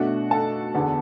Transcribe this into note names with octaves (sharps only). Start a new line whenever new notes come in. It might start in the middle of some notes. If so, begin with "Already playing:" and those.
Already playing: B2 A3 D4 F#4 F#5
A4 A5
E2 D3 B3 D4